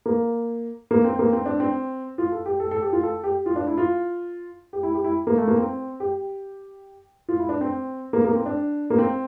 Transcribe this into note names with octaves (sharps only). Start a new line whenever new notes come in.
A#3
A#3
C4
A#3
C4
D4
C4
F4
A4
G4
A4
A4
G4
F4
A4
G4
F4
D4
E4
F4
G4
E4
G4
E4
A#3
A3
A#3
C4
G4
F4
E4
D4
C4
A#3
A#3
C4
D4
A#3
C4